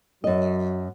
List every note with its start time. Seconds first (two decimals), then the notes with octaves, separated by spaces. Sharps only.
0.24 F#2 F#3 D#5